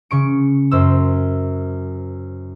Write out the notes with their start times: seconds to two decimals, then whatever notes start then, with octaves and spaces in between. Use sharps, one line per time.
0.11 C#3 C#6 D7
0.71 F#2 C5 E6